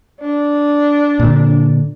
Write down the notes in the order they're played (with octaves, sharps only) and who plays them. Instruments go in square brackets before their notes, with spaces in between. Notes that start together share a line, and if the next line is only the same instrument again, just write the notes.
[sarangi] D4
[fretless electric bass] A#2 D3